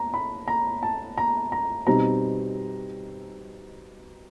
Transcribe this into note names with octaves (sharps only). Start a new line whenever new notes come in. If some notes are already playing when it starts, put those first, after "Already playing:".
Already playing: A#5
B5
A#5
A5
A#5
A#5
B2 G3 C4 D#4 A#5